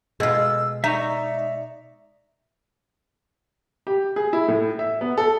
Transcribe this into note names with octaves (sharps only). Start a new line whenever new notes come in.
B2 G#3 F4 E6
D#4 D5 E5 A#5 C#6
G4
G#4
E4
A2
E5
B3
A4